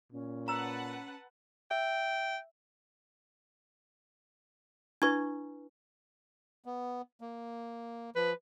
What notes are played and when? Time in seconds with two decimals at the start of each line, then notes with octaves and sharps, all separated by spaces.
0.12 A#2 C#4
0.48 B4 F#5 A5 A#5 E6
1.71 E5 G5
5.02 D4 E4 B4 C#6 G#6
6.65 B3
7.21 A#3
8.16 F3 B4